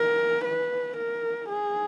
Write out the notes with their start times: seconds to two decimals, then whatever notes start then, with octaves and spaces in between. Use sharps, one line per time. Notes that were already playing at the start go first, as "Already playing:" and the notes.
Already playing: A#4
0.45 B4
0.97 A#4
1.49 G#4